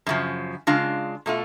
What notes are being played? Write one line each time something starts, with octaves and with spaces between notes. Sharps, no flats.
F#2 C#3 F3
C#3 G#3 D4 F4
B2 A3 F4